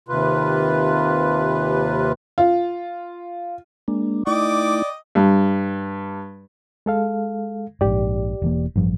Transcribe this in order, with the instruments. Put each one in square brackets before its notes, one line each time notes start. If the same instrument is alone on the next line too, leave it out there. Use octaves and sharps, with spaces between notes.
[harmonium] D#2 C3 F4 B4
[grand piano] F4
[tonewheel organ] G#3 A#3 D4
[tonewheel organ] A3 D#4 E4 [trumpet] D5 [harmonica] D#5 G5 D6
[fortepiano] G2
[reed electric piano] G#3 A4 F5
[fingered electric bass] A#1 G#2 [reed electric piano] G4 D5
[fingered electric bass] E1 E3 A#3
[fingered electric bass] A1 F3 [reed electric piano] G2